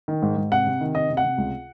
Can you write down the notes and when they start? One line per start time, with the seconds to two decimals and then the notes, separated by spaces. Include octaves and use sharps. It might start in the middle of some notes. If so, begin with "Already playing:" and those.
0.08 D#3
0.22 G#2
0.37 G#2
0.52 C3 F#5
0.67 C3
0.81 D#3
0.95 C3 D#5
1.10 C3
1.17 F#5
1.24 C3
1.38 C#2